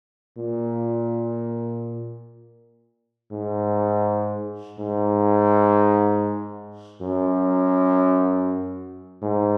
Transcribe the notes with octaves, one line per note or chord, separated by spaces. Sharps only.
A#2
G#2
G#2
F#2
G#2